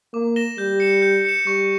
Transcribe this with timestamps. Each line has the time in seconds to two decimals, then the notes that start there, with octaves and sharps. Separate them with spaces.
0.14 A#3 D6
0.36 A#6 E7 G7
0.58 G3 G6
0.80 C#7 E7
1.02 G6
1.25 C#7 E7
1.46 G3 C#6